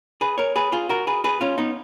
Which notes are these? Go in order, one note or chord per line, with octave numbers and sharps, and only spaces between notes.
G#4 B4
A#4 C#5
G#4 B4
F4 G#4
F#4 A#4
G#4 B4
G#4 B4
C#4 F4
B3 D#4